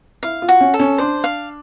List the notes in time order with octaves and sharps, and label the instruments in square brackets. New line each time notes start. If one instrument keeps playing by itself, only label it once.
[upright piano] E4 [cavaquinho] F5
[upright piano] F4
[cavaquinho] F#4
[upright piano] C#4
[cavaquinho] A4
[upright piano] C#4
[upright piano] D4 [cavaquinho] C5
[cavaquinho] F5